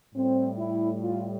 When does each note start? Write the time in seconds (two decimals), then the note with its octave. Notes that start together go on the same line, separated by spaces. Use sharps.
0.15 A2 G3 C4
0.59 E4
1.03 F4